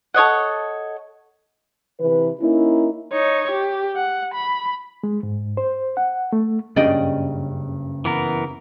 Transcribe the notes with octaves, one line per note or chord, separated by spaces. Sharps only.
A4 C#5 D#5 F#5
C3 E3 B4
A#3 C#4 D#4 E4
D#4 C#5
G4
F#5
B5
G#3
G#2
C5
F#5
A3
F#1 G2 C#3 D5 D#5 G5
E3 B3 A#4